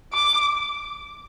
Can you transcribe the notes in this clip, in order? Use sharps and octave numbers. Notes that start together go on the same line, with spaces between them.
D6